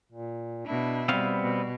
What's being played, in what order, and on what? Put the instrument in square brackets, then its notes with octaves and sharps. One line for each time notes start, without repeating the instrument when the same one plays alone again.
[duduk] A#2
[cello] B2 E4 [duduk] D4
[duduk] G3 [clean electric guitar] B3 C4 F5
[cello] B2